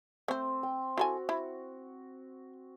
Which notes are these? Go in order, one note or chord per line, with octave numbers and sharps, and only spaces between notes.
A3 C4 C5
G5
E4 F#4 A4 G#5
E4